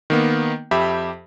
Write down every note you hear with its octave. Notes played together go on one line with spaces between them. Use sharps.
D#3 A#3 B3
F2 G4 E5 B5